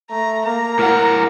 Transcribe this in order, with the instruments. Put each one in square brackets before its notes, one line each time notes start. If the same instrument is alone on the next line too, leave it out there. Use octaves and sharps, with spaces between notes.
[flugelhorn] A3 [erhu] A#5
[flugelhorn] A#3 [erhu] A#5
[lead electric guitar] A2 F#5 [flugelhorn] A#4